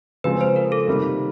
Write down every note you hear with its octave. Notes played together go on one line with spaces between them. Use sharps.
C#3 F3 G#3 C4 B4
C5
A#4
A4
C3 D#3 G3 A#3